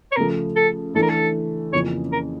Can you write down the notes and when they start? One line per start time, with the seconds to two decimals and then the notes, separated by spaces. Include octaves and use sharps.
0.12 C#5
0.16 C#3 F3 A3 A#4
0.56 A4
0.95 E3 A3 D4 A4
1.02 A#4
1.09 A4
1.73 F2 C#3 E3 A#3 C#4 C#5
2.12 A#4